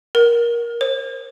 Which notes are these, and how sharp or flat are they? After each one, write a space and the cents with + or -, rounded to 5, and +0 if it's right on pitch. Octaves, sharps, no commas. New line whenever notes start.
A#4 +15
C5 +40